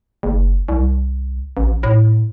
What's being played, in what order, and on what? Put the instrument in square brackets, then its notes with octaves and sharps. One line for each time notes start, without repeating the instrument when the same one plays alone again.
[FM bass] F#1
C2
A1
A2